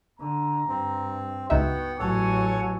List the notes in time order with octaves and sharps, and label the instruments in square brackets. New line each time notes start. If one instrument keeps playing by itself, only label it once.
[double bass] D3 [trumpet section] A#5
[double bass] G2 [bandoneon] C4
[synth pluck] C#2 D#4 E5 [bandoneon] B3 F#5 G5 [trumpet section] F#4
[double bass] A1 F#3 [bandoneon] A4 C#5 F#5 [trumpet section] G#5 C#6